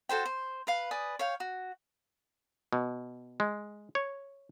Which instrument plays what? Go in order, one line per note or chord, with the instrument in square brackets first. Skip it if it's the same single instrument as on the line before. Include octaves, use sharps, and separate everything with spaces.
[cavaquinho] F#4 A4 C5 G5
C5
B4 F5
B4 D5 G#5 D#6
C#5 F5 G5
F#4
[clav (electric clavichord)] B2
G#3
C#5